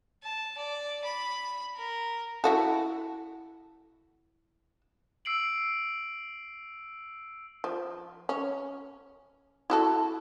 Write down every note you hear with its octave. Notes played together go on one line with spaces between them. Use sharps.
A5
D5
B5
A#4
E4 F#4 A4
E6 C7 D7 F#7
F3
C#4
E4 F#4 A4